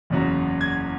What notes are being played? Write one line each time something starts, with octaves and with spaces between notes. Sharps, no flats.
F#1 E2 C#3 F#3
G#6